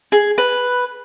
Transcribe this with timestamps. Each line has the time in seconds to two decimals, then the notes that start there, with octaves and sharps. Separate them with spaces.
0.12 G#4
0.38 B4